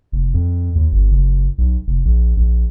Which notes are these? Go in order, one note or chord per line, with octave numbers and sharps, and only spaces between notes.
F1
F2
D#2
G1
F#1
B1
F1
A#1
A#1